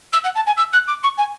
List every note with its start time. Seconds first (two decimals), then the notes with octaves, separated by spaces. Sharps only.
0.12 E6
0.24 F#5
0.35 A5
0.46 G#5
0.56 E6
0.72 F#6
0.87 D6
1.03 C#6
1.17 G#5